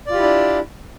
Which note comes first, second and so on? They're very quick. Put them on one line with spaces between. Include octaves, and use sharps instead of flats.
D5 F4 G4 E4 D4